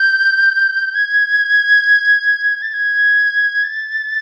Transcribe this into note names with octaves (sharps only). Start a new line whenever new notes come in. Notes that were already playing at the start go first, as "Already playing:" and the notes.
Already playing: G6
G#6
A6
G#6
A6